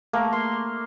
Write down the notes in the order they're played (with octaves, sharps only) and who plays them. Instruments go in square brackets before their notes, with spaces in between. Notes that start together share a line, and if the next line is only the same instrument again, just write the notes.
[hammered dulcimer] A3 A#3
C6